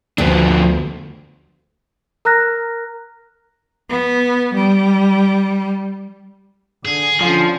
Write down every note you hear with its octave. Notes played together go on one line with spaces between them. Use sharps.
D2 F3 B3 D4
A#4 A#5 F6 F#6 A#6
B3
G3
D3 G#4
D3 F3 C#4